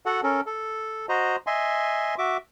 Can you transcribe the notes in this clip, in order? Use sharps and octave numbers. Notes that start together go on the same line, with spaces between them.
F#4 A4 F#5
C#4 A4 A#4
A4
F#4 C5 D#5 A#5
D#5 E5 G#5 C6
F#4 E5 D6